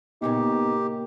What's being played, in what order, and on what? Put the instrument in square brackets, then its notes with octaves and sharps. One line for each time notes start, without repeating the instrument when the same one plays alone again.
[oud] A#2 C#3 A#3 [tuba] B3 [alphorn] D#4 [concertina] G4